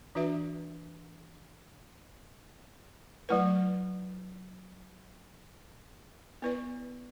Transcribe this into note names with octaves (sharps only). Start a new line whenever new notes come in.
E3 D4 F#4 B4 E5
F#3 A3 E4 B4
B3 E4 B4 D5